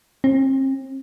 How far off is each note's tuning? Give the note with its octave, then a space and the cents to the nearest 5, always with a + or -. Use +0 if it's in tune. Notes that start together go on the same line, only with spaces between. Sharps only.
C4 +40